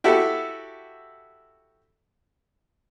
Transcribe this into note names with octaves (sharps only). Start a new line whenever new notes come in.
E4 F#4 G4 A4